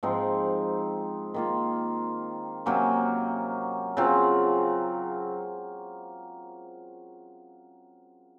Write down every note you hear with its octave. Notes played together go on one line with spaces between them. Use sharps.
G#2 F3 C4 D#4
D#3 A#3 F4
C3 F#3 A#3 C#4
C#3 F#3 C4 F4